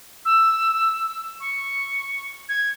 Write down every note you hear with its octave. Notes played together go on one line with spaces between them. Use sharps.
E6
C#6
G#6